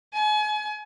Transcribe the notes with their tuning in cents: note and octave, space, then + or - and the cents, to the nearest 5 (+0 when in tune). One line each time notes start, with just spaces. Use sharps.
G#5 +35